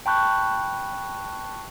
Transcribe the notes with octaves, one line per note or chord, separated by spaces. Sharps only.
G5 A5 B5 C#6 F#6 G6